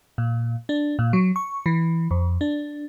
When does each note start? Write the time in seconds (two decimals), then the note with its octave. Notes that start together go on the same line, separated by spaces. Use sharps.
0.18 A#2
0.69 D4
0.99 A#2
1.13 F#3
1.36 C#6
1.66 E3
2.11 F2
2.41 D4